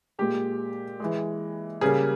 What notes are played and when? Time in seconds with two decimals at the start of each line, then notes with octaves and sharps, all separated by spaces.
0.19 A#2 G#3 G4
1.00 E3 G#3
1.81 C#3 G3 A#3 G#4